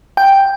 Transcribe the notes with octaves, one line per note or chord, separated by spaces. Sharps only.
G5